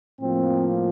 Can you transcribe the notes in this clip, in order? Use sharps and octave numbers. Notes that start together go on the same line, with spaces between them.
A2 F3 A#3 C4